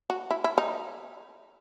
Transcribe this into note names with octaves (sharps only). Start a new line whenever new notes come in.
F#4
E4
E4
D#4